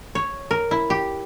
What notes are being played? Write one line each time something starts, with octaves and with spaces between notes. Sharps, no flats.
C#5
A#4
E4
G4